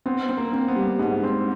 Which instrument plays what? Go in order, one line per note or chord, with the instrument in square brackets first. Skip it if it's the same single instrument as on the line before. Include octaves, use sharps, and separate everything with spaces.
[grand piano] B3 [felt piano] C4
[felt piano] C4
[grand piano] A#3
[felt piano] C4
[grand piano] B3
[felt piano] G3
[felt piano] G#2 [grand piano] B3
[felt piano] C4